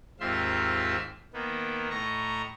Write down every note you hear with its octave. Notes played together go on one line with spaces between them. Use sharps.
D#2 G#2 C4 F4 E5 C6
D#3 A#3 B3
A2 D#5 A#5 C#6